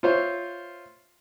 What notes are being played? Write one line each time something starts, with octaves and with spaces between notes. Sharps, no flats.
F4 C5 C#5 E5